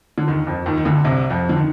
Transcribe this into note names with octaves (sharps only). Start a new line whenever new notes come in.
D3
D#2 D#3
F2 F3
D#2 D#3
D#3
D2 D3
C2 C3
F2 F3
D3
D#3